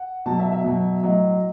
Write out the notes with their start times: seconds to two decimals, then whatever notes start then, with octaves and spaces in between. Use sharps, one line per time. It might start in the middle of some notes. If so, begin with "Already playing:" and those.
Already playing: F#5
0.26 B2 F#3 A5
0.40 E5
0.52 E5
0.64 B2 F#3
1.03 A2 F#3 D#5